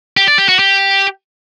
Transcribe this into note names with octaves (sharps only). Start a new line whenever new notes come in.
G4
D5
G4
F#4
G4